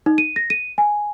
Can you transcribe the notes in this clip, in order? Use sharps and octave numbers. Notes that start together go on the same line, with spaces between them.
D#4
D#7
A#6
D#7
G#5